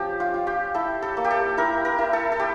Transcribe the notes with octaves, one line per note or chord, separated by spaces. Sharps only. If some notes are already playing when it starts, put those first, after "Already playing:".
Already playing: F3 C#4 G4
F4
F4
G4
E4 A4
A4
A#3
G4
A4
E4 A#4
A#4
E4
A4
A4
G4